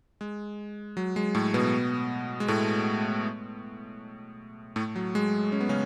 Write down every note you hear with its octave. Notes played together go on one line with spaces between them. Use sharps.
G#3
F#3
G#3
A2 A3
B2 B3
G#3
A2 A3
A2 A3
F#3
G#3
C#4
B3
C#3 C#4